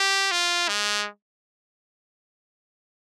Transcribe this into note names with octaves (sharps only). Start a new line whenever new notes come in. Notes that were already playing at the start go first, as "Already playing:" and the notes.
Already playing: G4
F4
G#3